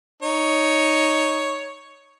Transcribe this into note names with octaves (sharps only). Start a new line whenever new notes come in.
D#4 C#5